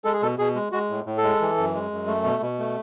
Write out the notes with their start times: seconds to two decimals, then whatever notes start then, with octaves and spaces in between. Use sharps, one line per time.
0.04 G#3 A4
0.13 G#4
0.22 B2 A4
0.39 B2 G#4
0.55 G#3
0.72 G#3 F#4
0.90 A2
1.06 A2
1.18 A4
1.23 G#3
1.41 E3
1.58 F#2
1.74 G#3
1.91 F#2
2.07 A3
2.24 B2
2.42 B2
2.59 A3